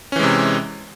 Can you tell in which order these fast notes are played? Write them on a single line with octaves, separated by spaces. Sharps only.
C#4 E3 G#3 C3